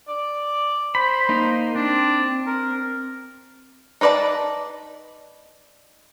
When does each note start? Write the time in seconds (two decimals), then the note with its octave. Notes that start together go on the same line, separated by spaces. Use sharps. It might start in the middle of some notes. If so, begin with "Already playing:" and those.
0.08 D5
0.95 C5 B5
1.29 A#3 D#4
1.75 C4 D4
2.46 A#4
4.01 D#4 B4 D5 D#5 A5